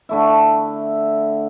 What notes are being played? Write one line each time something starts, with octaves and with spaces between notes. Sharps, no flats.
D3 A3 E4